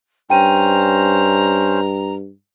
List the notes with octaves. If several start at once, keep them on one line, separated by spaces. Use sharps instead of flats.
G2 C#4 C5 G5 A#5 D#7